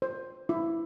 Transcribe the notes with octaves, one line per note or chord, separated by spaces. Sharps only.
C5
E4